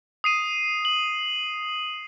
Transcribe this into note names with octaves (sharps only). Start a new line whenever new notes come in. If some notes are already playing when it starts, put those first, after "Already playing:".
D#6 C7 D#7
F#7